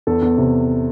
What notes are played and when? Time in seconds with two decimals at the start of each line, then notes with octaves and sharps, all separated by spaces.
0.07 E2 A4
0.22 E2
0.38 C3